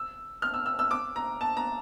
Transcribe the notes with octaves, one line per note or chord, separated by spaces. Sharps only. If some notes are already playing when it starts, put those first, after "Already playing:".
Already playing: E6
F6
E6
E6
E6
D6
A#5
A5
A#5